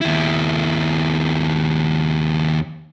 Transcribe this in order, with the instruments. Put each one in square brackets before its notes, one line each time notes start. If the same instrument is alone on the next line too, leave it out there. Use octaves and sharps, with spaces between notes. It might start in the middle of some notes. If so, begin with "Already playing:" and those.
[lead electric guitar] D#2 E4